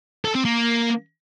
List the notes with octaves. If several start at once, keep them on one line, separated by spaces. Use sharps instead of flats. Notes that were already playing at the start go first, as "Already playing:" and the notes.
A4
C4
A#3